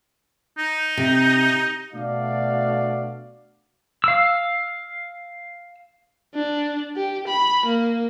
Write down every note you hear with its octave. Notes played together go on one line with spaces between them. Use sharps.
D#4
C3
B2 A3 D4 F#4 D5 F5
F5 E6
D4
G4
B5
A#3